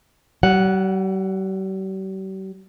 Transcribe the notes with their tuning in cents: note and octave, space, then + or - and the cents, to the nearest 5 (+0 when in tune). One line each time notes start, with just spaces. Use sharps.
G3 -45 F#5 +0